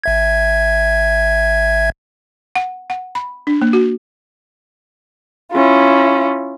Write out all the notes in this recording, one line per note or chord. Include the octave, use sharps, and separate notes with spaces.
G#1 E5 G#6
F#5
F#5
B5
D4
A#3
F#4
C#4 E4 F4